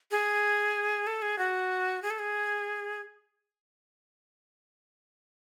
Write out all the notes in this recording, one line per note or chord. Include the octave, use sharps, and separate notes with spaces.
G#4
A4
G#4
F#4
G#4
A4
G#4